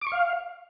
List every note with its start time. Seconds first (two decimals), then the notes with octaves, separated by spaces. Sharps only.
0.01 D6
0.07 C#6
0.12 F5